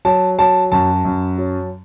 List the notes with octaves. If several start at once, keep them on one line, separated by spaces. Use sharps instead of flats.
F#3 A5
F#3 A5
F#2 A5
F#2
F#3